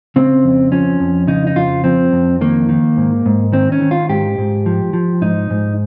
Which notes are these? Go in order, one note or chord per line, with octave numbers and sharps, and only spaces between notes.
C#3 C4
F2
F3 C#4
F2
C#3 D#4
D#4
F2 F4
F3 C4
F2
D#3 A#3
D#3
G#2
G#2
D#3 C4
C#4
D#3
F4
G#2 G4
G#2
F3
F3
G#2 D#4
G#2